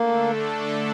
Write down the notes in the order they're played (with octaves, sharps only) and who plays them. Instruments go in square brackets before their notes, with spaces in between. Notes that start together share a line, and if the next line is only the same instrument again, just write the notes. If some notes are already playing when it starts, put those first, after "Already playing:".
Already playing: [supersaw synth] D3 A3 D4 A4 [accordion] A#3